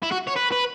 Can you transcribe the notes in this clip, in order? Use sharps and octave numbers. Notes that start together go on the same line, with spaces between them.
E4
F#4
C#5
B4
B4